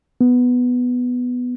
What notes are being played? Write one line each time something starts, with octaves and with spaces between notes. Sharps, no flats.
B3